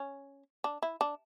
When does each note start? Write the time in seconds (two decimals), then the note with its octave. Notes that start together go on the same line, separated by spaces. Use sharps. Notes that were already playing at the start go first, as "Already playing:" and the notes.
Already playing: C#4
0.64 D4
0.82 E4
1.01 D4